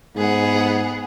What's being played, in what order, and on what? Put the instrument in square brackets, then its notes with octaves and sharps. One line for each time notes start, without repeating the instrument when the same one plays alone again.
[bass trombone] G#2 [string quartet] B3 G#4 F#5